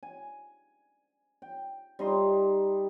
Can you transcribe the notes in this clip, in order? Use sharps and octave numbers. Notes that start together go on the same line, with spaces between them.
G#5
G5
G3 D#4 D#5 C6